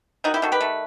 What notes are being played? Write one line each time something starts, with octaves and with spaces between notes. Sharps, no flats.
D#3 D#4 F#4
E4 G4
D#3 F#4 A4
G4 B4
A3